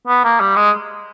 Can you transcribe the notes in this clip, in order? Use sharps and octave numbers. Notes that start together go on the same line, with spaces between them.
B3
A#3
G3
G#3